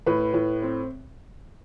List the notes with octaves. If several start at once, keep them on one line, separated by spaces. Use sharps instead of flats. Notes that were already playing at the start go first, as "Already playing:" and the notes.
A2 B4
A2
C4